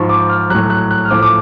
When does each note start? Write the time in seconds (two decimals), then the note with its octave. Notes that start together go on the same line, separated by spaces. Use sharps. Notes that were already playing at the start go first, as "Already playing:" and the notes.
Already playing: G#2 F3 C#6
0.09 D6
0.29 F6
0.50 A2 F#3 F#6
0.70 F#6
0.91 F#6
1.05 F6
1.11 A2 F3 D6
1.23 D6